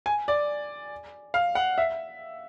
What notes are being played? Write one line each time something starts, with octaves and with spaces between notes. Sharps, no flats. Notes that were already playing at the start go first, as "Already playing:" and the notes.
G#5
D5
F5
F#5
E5